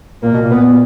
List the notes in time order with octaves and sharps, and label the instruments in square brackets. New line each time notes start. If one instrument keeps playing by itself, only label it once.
[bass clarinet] A#2 [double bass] A#3
[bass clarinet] B2
A#2
[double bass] B3